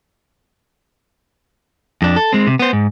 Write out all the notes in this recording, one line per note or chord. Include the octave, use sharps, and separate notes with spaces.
F2 D4
A4
G#3 C4
C3
B3 C5
G#2